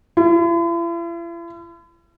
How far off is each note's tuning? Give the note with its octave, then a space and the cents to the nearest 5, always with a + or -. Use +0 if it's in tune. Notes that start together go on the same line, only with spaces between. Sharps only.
E4 +45